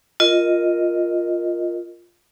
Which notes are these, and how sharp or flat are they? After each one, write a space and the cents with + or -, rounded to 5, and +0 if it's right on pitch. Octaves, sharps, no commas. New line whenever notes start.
F4 +0 A#4 +0 D#5 +0